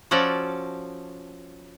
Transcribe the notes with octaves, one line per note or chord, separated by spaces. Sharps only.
F3 C#4 F#4 A4 D5